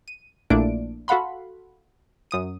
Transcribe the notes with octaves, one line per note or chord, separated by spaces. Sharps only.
D#7
A#1 A#2 A3 D4 E4 D7
F#4 A4 F5 F#5 B5 C6
F#2 D#6 D#7